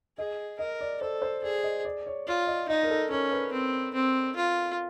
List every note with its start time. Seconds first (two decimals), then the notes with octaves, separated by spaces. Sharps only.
0.18 G#4 D#5
0.59 A#4 D#5
0.81 D5
1.01 A4 C5
1.22 C5
1.43 G#4 D5
1.64 D#5
1.85 D5
2.07 C#5
2.27 F4 D5
2.47 D#5
2.69 D#4 D#5
2.83 A#4
2.90 A4
3.11 C#4 A#4
3.32 B4
3.52 C4
3.94 C4
4.36 F4